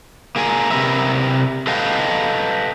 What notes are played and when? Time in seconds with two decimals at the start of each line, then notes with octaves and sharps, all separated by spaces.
0.36 A#3 G#4 A#4 G#5
0.71 C3 A#4 B4 E5
1.67 A4 B4 D#5 F5 G5